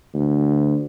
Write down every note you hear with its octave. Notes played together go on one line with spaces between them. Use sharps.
D2